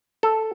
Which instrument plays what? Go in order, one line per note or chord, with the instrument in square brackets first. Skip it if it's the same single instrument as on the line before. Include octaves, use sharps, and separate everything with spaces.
[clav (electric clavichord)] A4